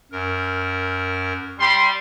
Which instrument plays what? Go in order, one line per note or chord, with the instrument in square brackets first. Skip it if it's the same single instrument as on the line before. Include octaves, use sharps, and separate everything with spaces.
[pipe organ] F#2 A#4
[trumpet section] G3 C6